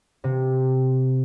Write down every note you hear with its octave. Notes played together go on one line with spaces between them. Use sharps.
C3